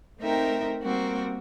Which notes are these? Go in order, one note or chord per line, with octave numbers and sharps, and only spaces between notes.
A3 C4 D#4 A#4 E5 G5
G3 A#3 C4 F#4 A#4